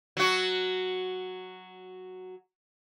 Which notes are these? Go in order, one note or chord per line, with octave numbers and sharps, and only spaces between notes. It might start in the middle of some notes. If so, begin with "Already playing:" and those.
F#3 F#4